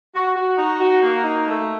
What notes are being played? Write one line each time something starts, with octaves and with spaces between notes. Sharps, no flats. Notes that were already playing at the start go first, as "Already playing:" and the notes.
F#4
F#4
D#4
F#4
A#3
D#4
A3